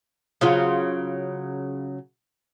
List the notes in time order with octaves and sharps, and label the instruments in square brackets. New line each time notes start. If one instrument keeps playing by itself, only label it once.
[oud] C#3 F#3 F4